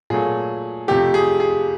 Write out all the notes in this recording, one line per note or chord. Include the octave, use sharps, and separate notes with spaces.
A#2 F#3 A3 G#4
F2 C3 F3 A3 G4
G#4
G#4